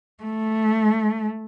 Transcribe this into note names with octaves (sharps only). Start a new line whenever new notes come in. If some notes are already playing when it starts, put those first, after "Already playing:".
A3